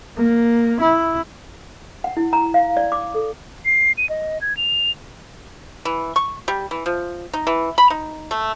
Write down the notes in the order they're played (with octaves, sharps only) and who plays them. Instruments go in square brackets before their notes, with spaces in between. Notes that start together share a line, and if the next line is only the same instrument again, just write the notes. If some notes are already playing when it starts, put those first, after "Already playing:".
[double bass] A#3
E4
[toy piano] F#5
E4
A#5
F5
D5
D6
A4
[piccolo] C7
D#7
D#5
G#6
F7
[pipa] E3
C#6
G3
E3
F3
D#4
E3
B5
D#4
A3